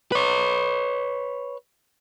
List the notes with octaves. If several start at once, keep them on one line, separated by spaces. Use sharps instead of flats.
B4 C#5